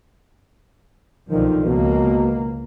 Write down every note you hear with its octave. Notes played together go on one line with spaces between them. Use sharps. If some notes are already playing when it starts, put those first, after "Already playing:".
B1 D3 D#3 F3
C#2 B2 A#3